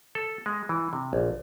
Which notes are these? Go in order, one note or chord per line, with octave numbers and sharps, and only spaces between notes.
A4
G#3
E3
C3
A#1